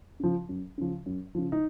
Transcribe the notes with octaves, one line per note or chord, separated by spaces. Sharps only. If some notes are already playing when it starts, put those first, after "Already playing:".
C#3 F3
F#2
C#3 F3
F#2
C#3 F3
D#4